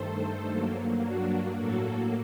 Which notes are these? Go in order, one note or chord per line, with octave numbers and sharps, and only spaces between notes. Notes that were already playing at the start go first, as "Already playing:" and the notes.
Already playing: G2 D#3 A3 A4 C5
G2 F#3 A#3
D4 F#4
A2 F#3 A#3 F#4 A4